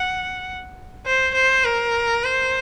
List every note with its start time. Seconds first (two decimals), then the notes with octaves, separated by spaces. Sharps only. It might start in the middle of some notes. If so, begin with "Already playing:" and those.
Already playing: F#5
1.06 C5
1.35 C5
1.65 A#4
2.23 C5